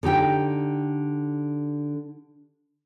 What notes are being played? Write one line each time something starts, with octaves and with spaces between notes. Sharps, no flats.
D3 D#4 G4 G5